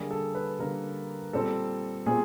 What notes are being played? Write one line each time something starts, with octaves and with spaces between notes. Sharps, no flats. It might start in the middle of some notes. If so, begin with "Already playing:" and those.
Already playing: D3 G3 A#3 G#4
A4
B4
D3 G3 A#3 A#4
A#2 G3 C4 A4
A#2 G3 C4 G#4